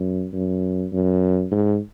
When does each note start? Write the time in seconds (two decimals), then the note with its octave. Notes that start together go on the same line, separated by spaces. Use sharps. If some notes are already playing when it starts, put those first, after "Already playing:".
Already playing: F#2
0.33 F#2
0.93 F#2
1.51 G#2